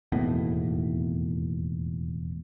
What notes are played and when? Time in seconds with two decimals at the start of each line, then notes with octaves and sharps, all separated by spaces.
0.12 E1 D#2 A2 B3